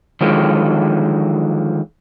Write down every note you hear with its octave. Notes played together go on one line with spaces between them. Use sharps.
D3 D#3 F3 F#3 G#3